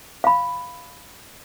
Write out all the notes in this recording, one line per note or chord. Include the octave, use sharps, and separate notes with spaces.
F5 B5